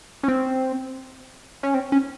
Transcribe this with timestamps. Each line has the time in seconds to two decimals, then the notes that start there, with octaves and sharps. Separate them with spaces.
0.23 C#4
0.28 C4
1.63 C#4
1.74 C4
1.92 C#4